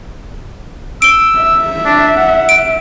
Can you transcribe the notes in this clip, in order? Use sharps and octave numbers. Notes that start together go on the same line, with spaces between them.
E6 D7 G7
E5
D4
F#5
D7